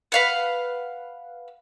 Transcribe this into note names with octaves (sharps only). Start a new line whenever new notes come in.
B4 F5 F#5